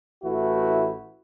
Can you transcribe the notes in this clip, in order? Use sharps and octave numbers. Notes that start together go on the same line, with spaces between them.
A1 E3 A3 E4 F#4